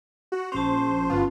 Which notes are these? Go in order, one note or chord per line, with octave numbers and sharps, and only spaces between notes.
F#4
A#1 C#4 C5 A5
G1 B3 F4